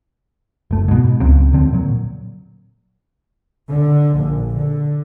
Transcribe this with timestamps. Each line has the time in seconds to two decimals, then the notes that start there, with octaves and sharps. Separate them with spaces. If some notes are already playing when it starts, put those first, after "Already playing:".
0.71 F#1 A3
0.88 G#2 B2
1.20 C#2 C#3 F#3 C4
1.53 E2 D3 C4
1.73 A#2 F#3
3.70 D3
4.17 A#1
4.54 D3